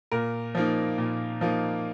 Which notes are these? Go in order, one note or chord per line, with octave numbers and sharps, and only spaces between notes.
A#2 A#4
F3 A#3 D#4
A#2
F3 A#3 D#4